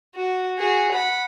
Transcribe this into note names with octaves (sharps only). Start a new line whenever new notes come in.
F#4
F#4 G#4
F#5 B5